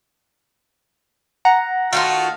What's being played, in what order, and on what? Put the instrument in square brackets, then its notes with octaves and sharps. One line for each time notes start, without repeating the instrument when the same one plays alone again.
[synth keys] F#5 A#5
[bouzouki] D#3 A3 F4 [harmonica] F#4 F5